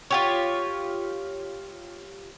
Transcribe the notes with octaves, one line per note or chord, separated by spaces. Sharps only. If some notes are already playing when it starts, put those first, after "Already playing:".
F4 G4 C#5